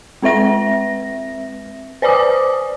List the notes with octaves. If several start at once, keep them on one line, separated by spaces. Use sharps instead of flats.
G#3 C4 B4 E5 A#6
B4 C5 D5 G#5 D6 D#6